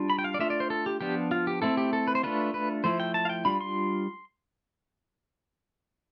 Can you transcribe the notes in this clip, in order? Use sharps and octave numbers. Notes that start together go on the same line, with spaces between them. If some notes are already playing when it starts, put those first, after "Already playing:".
Already playing: G3 D4 F4
B5
G5
F5
D5
A3 D4 F4 E5
D5
C5
A4
G4
F3 B3 D4 F4 G4
F4
G4
A3 C4 E4 A4
G4
A4
B4
C5
A3 D4 F4 B4
B4
F3 A3 E4 C5
G5
A5
F5
G5
G3 D4 F4 B5
C6